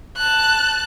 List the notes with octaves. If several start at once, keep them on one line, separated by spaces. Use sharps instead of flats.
A5 F#6